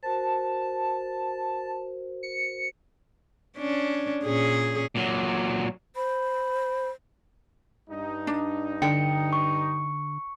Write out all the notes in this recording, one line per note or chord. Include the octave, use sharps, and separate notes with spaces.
F#4 A#4 C5 A5
C#7
C#4 D4
A#2 C#4 G#4
A#2 F#3
C5 B5
G2 D#4
D4
D3 G5 C#7
C#6